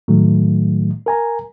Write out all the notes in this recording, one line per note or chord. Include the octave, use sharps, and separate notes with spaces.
A2 D#3 F#3 A3
A#4 G#5 A#5